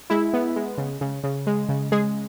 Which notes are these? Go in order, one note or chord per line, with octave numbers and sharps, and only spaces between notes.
G#3 E4
B3
G#3
C#3
C#3
C#3
G#3
C#3
G#3 G#4